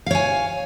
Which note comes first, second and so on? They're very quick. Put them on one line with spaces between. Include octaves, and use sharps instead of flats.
F5 C#5 G#5